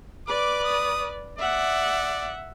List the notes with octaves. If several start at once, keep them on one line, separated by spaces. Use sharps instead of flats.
B4 D5 D6
D#6
D5 E5 F#5